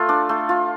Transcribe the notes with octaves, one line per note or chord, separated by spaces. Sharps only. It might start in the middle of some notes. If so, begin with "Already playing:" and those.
Already playing: A3 F4
D4
A3
F4